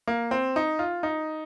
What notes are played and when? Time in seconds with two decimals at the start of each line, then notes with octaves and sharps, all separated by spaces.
0.08 A#3
0.31 C4
0.56 D#4
0.79 F4
1.03 D#4